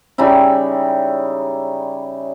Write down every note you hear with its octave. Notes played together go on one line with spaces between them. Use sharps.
C#3 G3 D#4 E4